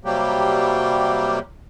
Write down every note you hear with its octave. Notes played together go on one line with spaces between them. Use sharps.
C3 F#3 G3 A#3 G4